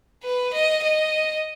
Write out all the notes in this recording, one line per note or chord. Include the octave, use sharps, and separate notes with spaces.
B4
D#5
D#5